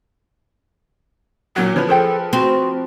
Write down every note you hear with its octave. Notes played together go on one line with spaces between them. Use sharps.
A#2 F#3 F#4
F3 B4 C#5
G#4 A4 C5 G5
C4 F#4